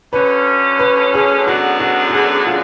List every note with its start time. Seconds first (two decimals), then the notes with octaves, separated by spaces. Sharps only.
0.13 D3 F#3 C#4 B4
0.79 B4
1.14 G#4
1.46 F#2 D3 G#3 B3 D4 F#4
1.80 F#4
2.09 F#4
2.13 G#4
2.47 F4